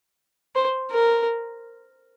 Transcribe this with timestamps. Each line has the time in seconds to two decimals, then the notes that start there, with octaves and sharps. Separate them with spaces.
0.55 C5
0.92 A#4